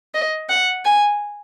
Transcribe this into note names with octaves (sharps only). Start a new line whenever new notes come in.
D#5
F#5
G#5